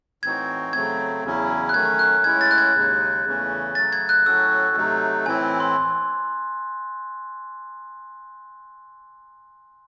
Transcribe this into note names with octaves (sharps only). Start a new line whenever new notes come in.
A2 E3 C4 D#4 F#4 G#6
C#3 F#3 A3 C4 G#6
E2 C#3 F#3 C#4 E4
F#6
D#3 F#3 A3 C#4 G#6
F#6
A2 G#3 C#4 E4 G#6
A6
F#6
G#6
D#2 C#3 G#3 D#4
E2 C#3 E3 A3 C#4
C#3 F#3 A3 A6
G#6
F#6
A2 F#3 C#4 F#4 A4 E6
C3 F#3 A3 D#4
A2 E3 C4 E4 G#5
C6